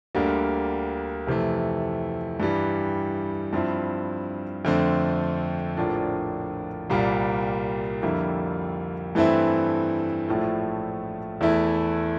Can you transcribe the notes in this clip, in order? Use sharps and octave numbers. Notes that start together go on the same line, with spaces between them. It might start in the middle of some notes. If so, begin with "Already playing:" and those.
D2 D3 G3 A#3
F2 C3 E3 A3
G2 E3 G3
G2 F3 C4 E4
F2 D3 A3 C4
A#1 A2 F3 A#3 D4
C2 A#2 G3 A#3
F2 D3 G3 A#3 E4
G2 E3 A3 C4 E4
A#1 A2 F3 A3 E4
E2 E3 A3 E4